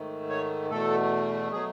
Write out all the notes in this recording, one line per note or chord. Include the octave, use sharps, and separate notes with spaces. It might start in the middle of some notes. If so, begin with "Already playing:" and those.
Already playing: G#2 D#3 A3
C#5
E2 B2 A3 A4
B2 F#3 A3 G#4